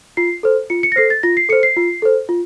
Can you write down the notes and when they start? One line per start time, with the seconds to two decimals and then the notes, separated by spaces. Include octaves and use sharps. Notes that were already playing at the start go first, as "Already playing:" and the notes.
0.17 F4 C7
0.43 A4 C5
0.70 F4 C#7
0.83 C#7
0.92 A#6
0.96 A4 C5 C7
1.10 A6
1.23 F4 A#6
1.37 C7
1.49 A4 C#7
1.53 C5
1.63 C7
1.76 F4
2.02 A4 C5
2.29 F4